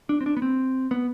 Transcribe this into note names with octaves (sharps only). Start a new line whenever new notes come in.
D4
C4
D4
B3
C4
B3